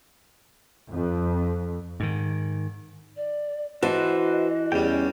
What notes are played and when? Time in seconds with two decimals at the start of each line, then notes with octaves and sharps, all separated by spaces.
0.91 F2
2.00 G#2 D#3
3.16 D5
3.83 E3 F#4 B4 C5 D#5 A5
4.72 E2 G3 C#4 G5